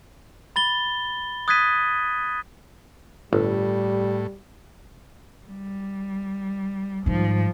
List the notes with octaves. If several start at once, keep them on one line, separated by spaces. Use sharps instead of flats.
B5 A6 G7
D#6 F#6 G#6 A6 B6 D#7
G1 A2 G3
G3
G#2 D#3 F3 G3